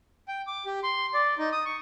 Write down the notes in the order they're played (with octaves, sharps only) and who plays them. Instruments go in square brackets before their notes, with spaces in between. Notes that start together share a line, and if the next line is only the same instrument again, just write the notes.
[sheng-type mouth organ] G5
D6
G4
C6
D5
D#4
D#6
C#6